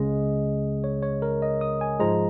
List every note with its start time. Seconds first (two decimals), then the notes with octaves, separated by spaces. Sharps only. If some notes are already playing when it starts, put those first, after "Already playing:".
Already playing: C#2 C#3 G#3 D#5
0.84 C#5
1.02 C#5
1.22 A#4
1.42 D#5
1.61 D#6
1.81 G#5
2.00 G#2 F3 G#3 A#5